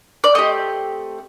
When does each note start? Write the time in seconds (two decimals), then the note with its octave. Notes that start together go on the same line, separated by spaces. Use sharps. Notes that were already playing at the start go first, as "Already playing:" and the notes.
0.24 D5
0.35 A3 C4 G4 D#5